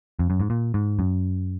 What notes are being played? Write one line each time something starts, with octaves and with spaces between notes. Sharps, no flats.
F2
F#2
G#2
A#2
G#2
F#2